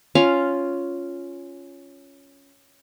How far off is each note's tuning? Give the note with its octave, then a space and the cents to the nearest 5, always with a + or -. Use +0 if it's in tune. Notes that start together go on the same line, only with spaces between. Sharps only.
C#4 +5 F4 +0 F5 +0